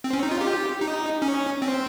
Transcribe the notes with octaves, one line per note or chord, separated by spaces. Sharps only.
C4
C#4
D#4
F4
G4
D#4
C#4
C4